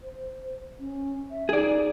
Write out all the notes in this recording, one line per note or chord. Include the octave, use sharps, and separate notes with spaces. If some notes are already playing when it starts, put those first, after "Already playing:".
C5
C#4
E5
D#4 G#4 D5